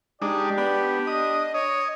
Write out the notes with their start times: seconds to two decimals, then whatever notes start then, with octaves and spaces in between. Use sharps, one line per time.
0.22 G#3 D4 D#4 G4 D5
0.58 B3 D4
1.07 D#5 D#6
1.54 C#5 D#5